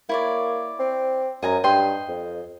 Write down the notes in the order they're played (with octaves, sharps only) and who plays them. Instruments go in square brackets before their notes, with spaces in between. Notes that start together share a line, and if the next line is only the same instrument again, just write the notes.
[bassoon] A#3 [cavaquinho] E4 C#5 D5
[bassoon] C4
[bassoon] F#2 [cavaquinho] D#5 G#5 A#5
[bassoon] G2 [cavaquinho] D#5 G5 C6
[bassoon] F2